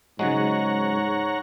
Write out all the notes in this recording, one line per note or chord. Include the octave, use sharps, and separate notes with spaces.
G#2 C#3 F#3 G#3 C#5 F#5 A#5